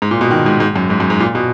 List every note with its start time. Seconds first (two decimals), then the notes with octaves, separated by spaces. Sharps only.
0.02 G#2
0.11 A#2
0.21 B2
0.31 D#3
0.46 G#2
0.60 G#2
0.76 F#2
0.90 G#2
1.00 F#2
1.10 G#2
1.20 A#2
1.35 B2